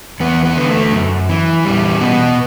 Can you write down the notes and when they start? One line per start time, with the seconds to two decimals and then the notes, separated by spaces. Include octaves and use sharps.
0.20 E2 B3
0.45 B3
0.57 D3
0.69 A3
0.92 F#2
1.29 E3
1.65 E2 G3
2.01 B2 B3